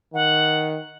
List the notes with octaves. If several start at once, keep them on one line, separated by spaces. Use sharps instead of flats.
D#3 F#5